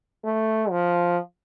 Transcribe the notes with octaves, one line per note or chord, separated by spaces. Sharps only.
A3
F3